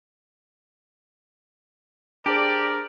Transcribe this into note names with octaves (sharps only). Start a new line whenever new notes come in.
D4 G4 G#4 A#4 C5 D5